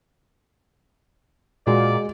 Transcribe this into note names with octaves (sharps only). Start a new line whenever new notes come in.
A#2 G#3 F#4 D5